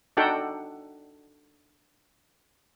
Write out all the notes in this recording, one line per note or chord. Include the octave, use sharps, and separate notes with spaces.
D4 D#4 F#4 A4 F#5 G5